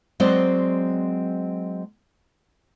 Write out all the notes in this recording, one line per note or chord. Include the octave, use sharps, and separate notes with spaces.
F#3 G#3 C4 C5 D5 D#5